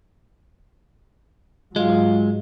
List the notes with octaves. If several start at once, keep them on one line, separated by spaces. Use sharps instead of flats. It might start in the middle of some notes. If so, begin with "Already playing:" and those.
G#2 F#3 G#3 F4